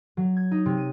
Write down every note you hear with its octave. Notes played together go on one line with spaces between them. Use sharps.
F#3
G#6
D#4
C3
D#7